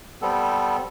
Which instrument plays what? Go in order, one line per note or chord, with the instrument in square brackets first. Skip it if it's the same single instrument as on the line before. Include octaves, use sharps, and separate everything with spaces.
[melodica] G3 B3 C4 A4